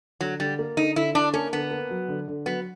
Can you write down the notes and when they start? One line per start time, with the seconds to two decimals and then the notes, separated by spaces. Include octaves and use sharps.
0.21 D3 F#3
0.39 D3 G3
0.59 A#3
0.77 D3 D#4
0.96 D3 E4
1.14 D3 D4
1.34 A#3 C#4
1.52 D3 B3
1.71 A#3
1.90 F#3
2.08 D3
2.28 D3
2.46 F#3 B3